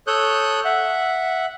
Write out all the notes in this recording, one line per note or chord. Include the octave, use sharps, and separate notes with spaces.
A4 C#5 D#6 F#6 G6
E5 F#5